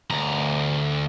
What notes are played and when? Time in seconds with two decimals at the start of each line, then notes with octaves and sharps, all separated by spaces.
0.11 D2 A#5